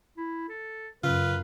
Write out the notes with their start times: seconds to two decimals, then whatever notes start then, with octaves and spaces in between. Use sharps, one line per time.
0.17 E4
0.49 A4
1.04 F#2 C#3 F4 B4